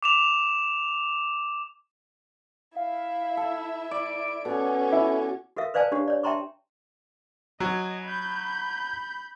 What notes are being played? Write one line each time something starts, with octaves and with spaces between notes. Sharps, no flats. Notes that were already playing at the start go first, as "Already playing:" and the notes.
D6 E7 F7
E4 E5 F5
A4
D5 D7
B2 C#4 A4
E4
F#4 A4 A#4 E5 F5
B4 C5 D5 F5 G#5 A5
D4 F#4 G4 C#5
C#5 D5
E5 G5 A5 A#5 C6 C#6
F#3 D#5 G#5
B5 G6